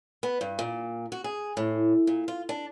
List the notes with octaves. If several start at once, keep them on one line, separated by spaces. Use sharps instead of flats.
B3
G2
A#2
F#4
G#4
A2
A#2
F4
D4